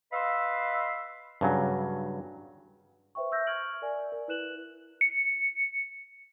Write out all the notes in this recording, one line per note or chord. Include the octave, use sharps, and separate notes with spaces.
B4 D#5 F5 B5 C6 E6
G2 C#3 F#3
B4 C5 E5 G5 C#6
E5 E6 F6 G6 A#6
C#6 F6 G#6 D7 F#7
A#4 D5 E5 G#5
A#4
E4 B4 F#6 E7 F#7
C#7